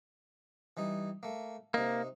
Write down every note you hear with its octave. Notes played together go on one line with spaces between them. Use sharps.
E3 G3 D#4
A3 A#3
C3 A#3 D#4